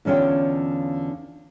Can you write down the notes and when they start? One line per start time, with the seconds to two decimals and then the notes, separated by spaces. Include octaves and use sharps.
0.05 E2 D3 C#4 F4 G5